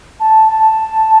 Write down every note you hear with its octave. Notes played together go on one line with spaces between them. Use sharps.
A5
A5